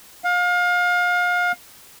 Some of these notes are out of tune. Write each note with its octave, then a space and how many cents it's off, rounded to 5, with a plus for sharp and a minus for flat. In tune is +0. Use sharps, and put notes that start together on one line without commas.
F5 +30